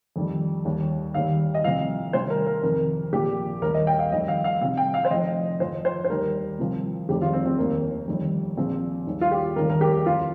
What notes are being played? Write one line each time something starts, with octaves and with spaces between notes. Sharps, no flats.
F2 D#3 G3
D#2 D#3 G3
D#2 D#3 G3 F5
D#5
C2 C3 F3 F5
C2 C3 D#3 C5
A#4
A#4
F2 C3 D#3 A#4
A#1 A#2 F3 G4
D#2 D#3 G3 A#4
D#5
G5
F5
F2 D#3 G3 D#5
F5
F5
C2 C3 F3 F5
G5
F5
C5
F1 F2 F3 D#5
F2 F3 C5
C5
C5
D#2 D#3 G3 A#4
C2 C3 F3
F1 F2 D#3 G3 G4
F4
C4
C4
F1 D#2 D#3 A#3
G1 F2 D#3 G3
A#1 A#2 F3 C4
D#2 D#3 G3
F4
G4
F1 D#2 D#3 G3 A#4
A#4
G4
F2 F3 F4